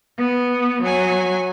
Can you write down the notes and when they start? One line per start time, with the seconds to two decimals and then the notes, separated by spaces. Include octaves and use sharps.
0.19 B3
0.83 F#3 G#5